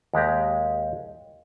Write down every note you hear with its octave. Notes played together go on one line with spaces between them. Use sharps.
D#2 G#3 G4 A#5